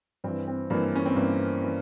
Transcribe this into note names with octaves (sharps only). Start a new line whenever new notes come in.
G2 E3 C4
C4
G2 E3 A#3
C#4
C4
G2 E3 A#3
E3